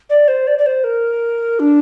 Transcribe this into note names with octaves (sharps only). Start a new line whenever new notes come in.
D5
C5
D5
D5
C5
A#4
D4